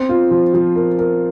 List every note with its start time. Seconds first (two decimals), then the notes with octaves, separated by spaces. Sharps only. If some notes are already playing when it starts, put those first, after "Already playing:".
Already playing: C4
0.09 F4
0.31 F3
0.54 F3
0.76 A#4
0.99 A#4